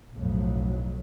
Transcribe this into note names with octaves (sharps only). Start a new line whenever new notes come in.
B1 F2 A2 F#3